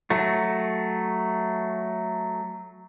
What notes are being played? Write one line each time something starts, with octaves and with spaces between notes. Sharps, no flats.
F#3 A3